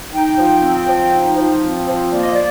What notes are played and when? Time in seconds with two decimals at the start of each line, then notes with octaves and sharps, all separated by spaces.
0.12 D#4 G5
0.38 F3
0.62 C4
0.87 F3
1.12 D#4
1.37 F3
1.62 C4
1.88 F3
2.12 A#3 D5
2.22 D#5
2.33 D5